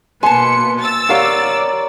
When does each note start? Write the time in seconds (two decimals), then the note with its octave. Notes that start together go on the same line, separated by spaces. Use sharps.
0.23 B2 A#3 B4 G#5 A5 C6 C#7
0.80 E6 A6
1.09 G4 A#4 C#5 D5 F5 F#5